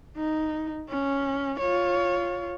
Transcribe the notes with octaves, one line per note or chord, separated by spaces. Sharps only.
D#4
C#4
F4 C#5